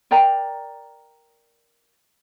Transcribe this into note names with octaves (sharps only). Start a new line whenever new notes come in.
A#4 D5 G5 A#5